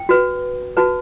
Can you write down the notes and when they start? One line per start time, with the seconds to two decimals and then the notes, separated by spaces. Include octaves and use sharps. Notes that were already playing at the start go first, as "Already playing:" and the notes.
Already playing: G5
0.09 F#4 B4
0.77 F#4 B4 A5